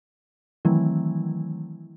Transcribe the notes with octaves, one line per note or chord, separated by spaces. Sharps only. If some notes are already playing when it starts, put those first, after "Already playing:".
D#3 E3 F#3 A3 C4 E4